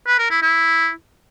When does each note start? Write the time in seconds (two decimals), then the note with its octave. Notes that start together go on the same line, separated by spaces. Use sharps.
0.07 B4
0.19 A#4
0.30 E4
0.42 E4